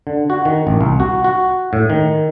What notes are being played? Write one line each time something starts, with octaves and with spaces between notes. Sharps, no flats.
D3
F#4
D#3
A1
C2
F#4
F#4
A2
D#3